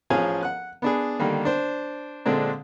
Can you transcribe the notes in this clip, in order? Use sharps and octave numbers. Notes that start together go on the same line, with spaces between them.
A1 F3 C#4 G#4 F5 G#5
F#5 F#6
B3 D4 G#4
D3 D#3 G3 A#3
D4 C5
A#2 D3 G#3 C4 D4